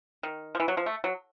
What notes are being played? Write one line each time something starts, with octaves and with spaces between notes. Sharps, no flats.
D#3
F3
E3
F#3
F3
A3
F#3